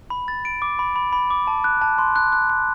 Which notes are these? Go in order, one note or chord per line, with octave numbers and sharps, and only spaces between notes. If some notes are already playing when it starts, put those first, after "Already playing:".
B5
A6
D7
D6
B5
B5
B5
D6
A5
F#6
A5
C6
F#6
F#6
F#6